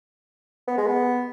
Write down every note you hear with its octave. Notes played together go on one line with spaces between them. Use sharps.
B3
G#3
B3